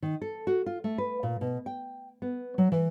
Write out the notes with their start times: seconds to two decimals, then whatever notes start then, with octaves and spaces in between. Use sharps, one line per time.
0.02 D#3
0.22 A4
0.47 F#4
0.66 F4
0.84 A3
0.98 B4
1.23 A#2
1.41 B2
1.66 G5
2.22 B3
2.58 F#3
2.72 E3